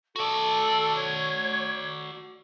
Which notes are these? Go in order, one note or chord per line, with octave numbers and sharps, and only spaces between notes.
F#4 A4 D5
C#5